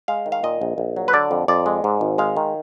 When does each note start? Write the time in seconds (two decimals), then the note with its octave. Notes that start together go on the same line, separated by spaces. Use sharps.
0.08 G#3 F5
0.26 D#3
0.32 F5
0.43 A#2 D#5
0.61 A#1
0.78 A#1
0.96 F#3
1.08 B4
1.13 D3 D5
1.31 F2
1.48 F2 D5
1.66 G#3
1.84 G#2
2.01 G#1
2.18 G#3 F5
2.36 D#3